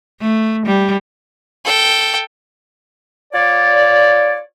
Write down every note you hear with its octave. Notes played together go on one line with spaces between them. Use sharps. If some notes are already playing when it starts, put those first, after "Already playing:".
A3
G3
A4 G5
F4 C#5 D5